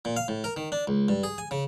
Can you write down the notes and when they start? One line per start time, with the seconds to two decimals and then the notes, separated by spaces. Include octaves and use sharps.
0.05 A#2
0.17 F5
0.28 A2
0.44 A#4
0.57 D#3
0.72 D4
0.87 C#2
1.09 G2
1.23 G#4
1.38 G#5
1.51 C#3